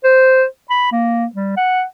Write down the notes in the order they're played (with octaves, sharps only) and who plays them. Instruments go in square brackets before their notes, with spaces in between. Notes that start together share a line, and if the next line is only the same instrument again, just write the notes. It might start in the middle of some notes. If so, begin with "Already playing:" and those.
[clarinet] C5
B5
A#3
G3
F#5